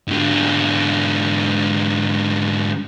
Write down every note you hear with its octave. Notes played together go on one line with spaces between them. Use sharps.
G#2 D3